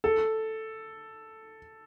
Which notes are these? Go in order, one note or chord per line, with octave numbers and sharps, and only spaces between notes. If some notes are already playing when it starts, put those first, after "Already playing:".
A4